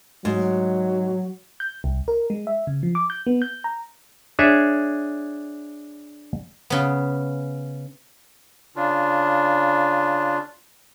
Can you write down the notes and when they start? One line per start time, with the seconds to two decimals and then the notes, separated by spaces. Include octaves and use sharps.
0.25 G#2 F#3
1.60 G6
1.84 C2
2.08 A#4
2.30 G#3
2.47 E5
2.67 C#3
2.83 F3
2.95 D6
3.10 G6
3.26 B3
3.42 G6
3.64 A#5
4.39 D4 G#4 C#5 E5
6.70 C#3 B3
8.76 C#3 D4 F4